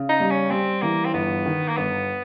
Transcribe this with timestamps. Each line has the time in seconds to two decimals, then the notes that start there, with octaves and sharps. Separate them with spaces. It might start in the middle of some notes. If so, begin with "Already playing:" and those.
Already playing: C#3
0.09 D#4
0.20 G3
0.31 C#4
0.51 G3 C4
0.82 E3 A#3
1.06 C4
1.13 G1 B3
1.46 D#3
1.69 A#3
1.77 G1 B3